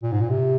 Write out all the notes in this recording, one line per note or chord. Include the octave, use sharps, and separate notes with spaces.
A#2
G#2
A#2
C3